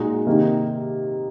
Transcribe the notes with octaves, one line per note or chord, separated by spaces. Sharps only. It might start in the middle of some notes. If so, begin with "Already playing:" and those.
Already playing: A#2 G#3 D#4 F#4
C3 D#3 A#3 D#4